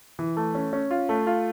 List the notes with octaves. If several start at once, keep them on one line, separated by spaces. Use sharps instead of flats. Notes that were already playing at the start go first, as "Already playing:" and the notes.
E3
A3
C#4
C#4
F4
A3
F4